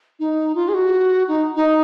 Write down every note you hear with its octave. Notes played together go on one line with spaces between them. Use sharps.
D#4
F4
G#4
F#4
D#4
D#4